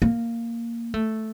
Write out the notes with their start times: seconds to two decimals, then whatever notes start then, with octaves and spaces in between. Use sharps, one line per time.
0.02 A#3
0.94 A3